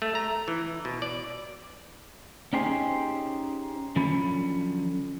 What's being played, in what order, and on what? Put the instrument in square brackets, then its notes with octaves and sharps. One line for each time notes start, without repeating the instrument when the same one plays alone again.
[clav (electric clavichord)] A3
A#5
E3
B2
D5
[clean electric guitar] C#4 D#4 G4 G#4 C5
D3 F3 F#3 C#4 B5